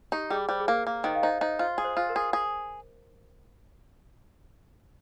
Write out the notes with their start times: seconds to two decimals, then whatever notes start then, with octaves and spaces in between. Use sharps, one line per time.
0.12 D#4 G4
0.30 G3 G#4
0.49 G3 C5
0.60 G#4
0.68 A#3 A#4
0.87 A#3
1.04 D#3 C5 D#5
1.15 F5
1.23 D#4 C5 D#5
1.41 D#4 C5 D#5
1.59 F4 C5
1.78 G#4
1.85 C5
1.97 F4 C5
2.09 A#4
2.16 G#4
2.33 G#4